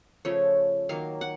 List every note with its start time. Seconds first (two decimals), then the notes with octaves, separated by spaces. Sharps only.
0.25 C#3 F3 A3 C#5
0.89 D#3 F#3 A#3 F5
1.21 F#5